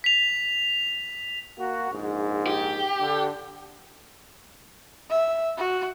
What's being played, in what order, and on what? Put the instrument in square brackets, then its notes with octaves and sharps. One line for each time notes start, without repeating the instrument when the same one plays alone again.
[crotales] B6 F7
[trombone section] A#3 F#4
A#1 G#2
[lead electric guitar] G4
[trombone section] D3
[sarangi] E5
F#4